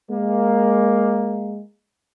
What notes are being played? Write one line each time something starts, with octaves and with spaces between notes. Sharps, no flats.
G#3 A#3